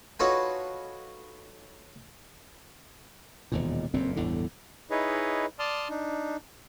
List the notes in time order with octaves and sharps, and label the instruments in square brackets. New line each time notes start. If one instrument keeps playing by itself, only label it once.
[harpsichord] D#4 F4 F#4 A4 B4 C#5
[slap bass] E1 D#2 A#2
F#1 F2 A#2 C4
G1 E2 A2 D3
[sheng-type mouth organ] D#4 E4 G#4 B4 C#5 D#5
D5 A5 C6 D#6 F6
D4 D#4